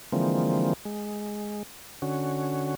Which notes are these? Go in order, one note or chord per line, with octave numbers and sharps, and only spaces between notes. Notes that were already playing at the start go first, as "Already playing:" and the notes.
D3 E3 F3 G#3 A#3 C4
G#3
D3 C#4 F#4